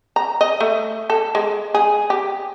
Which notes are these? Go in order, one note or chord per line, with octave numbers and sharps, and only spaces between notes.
A#5
D#5
A3
A4
G#3
G#4
G4